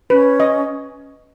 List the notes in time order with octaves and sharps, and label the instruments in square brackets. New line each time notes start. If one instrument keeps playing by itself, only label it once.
[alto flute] C#4 [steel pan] B4
[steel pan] D#5